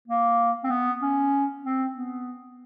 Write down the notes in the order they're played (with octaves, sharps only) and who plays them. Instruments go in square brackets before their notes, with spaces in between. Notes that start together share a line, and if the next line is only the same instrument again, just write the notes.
[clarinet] A#3
C4
B3
C#4
C4
B3